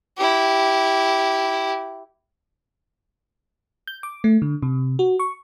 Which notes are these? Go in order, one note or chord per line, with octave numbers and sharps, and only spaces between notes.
E4 G4
G6
D6
A3
D3
C3
F#4
C#6